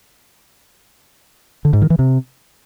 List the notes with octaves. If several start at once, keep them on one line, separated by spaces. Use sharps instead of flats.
D3
G#2
D#3
E3
C3